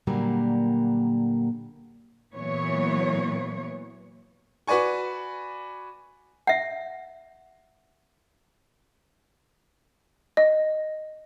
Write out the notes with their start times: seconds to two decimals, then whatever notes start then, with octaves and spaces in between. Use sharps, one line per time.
0.07 A#2 D3 F#3 G3 A#3
2.34 A#2 E3 F#3 B3 C#5
4.67 F#4 B4 D5 G#5 C#6
6.47 E5 F#5
10.37 D#5